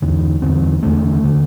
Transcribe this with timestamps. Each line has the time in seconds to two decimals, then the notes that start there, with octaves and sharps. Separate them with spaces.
0.02 E2 D3
0.42 E2 D3 C4
0.83 E2 D3 A3
1.24 D3